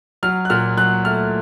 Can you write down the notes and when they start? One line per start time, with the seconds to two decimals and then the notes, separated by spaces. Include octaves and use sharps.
0.23 F#3 F6
0.45 F#6
0.50 A#2 F6
0.77 F#3 F#6
1.05 A3 F6